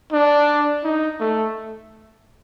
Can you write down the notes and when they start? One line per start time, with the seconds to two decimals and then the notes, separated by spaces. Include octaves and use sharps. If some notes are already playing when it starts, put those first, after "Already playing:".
0.12 D4
0.84 D#4
1.20 A3